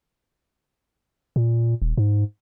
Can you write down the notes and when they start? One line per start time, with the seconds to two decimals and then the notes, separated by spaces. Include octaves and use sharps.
1.36 A#2
1.82 D#1
1.97 G#2